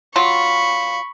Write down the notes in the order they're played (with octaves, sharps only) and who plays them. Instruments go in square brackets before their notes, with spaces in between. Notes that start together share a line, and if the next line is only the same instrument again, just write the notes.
[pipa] F#3 F4 [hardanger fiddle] B5 C#6